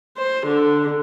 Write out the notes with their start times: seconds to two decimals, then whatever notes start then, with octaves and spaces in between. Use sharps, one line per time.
0.18 C5
0.47 D3